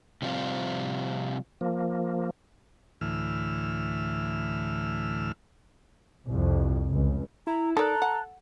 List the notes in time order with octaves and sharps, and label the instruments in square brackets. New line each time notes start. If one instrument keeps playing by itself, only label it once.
[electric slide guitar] C3 F3 G3 C4 F4
[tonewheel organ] F3 A#3
[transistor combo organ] D2 A2 E3 E6 F6
[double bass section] C2 F2
C#2
[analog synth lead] E4 [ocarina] A#5
[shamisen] D#4 A#4 D5 [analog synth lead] A4 [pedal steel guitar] A5 F#6 [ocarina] A#5
[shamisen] F#5